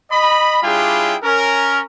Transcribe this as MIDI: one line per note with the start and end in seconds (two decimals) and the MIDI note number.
0.11 0.58 75
0.11 0.58 83
0.63 1.15 55
0.63 1.15 62
0.63 1.15 64
0.63 1.15 65
0.63 1.15 68
0.63 1.15 79
1.23 1.81 61
1.23 1.81 70